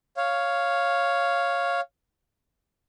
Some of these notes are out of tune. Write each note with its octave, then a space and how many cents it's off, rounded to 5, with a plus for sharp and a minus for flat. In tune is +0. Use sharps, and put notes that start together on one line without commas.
C#5 +0 F5 +0